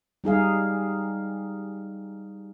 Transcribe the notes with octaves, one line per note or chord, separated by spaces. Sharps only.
G3 D#4 G#4 F5